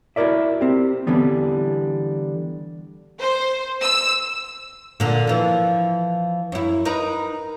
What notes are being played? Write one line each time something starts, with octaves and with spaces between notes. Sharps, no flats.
E4 F#4 A#4 D5 E5
C4 G4
D3 E3 G3 B3
C5
E6
A#2 D3
E3 F3
F#2 E4
D#4 A#4 B4